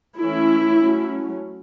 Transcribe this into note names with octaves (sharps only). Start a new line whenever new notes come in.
E3 A3 C#4 E4
F#3 A3 C#4